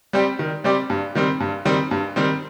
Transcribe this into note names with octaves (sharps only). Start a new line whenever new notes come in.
G3 C4 G4 D5
D#3
G3 C4 G4 D5
G2
D#3 G3 C4
G2
D#3 G3 C4
G2
D#3 G3 C4